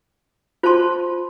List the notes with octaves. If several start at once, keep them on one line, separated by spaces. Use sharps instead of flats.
F4 C5 A5 C6